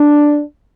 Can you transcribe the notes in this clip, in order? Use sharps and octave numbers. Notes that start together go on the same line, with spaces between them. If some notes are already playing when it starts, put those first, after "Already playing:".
Already playing: D4